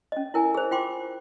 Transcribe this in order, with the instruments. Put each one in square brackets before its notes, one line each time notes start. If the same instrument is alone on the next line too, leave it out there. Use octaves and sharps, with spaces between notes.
[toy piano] C#4 D#5
E4 A#4 G#5
G#4 C5
F4 G5 C6 D6